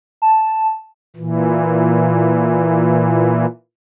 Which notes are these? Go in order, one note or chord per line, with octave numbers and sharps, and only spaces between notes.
A5
A#2 E3